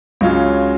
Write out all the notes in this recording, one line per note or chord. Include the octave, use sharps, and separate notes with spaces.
C#2 C#3 F#3 C#4 F4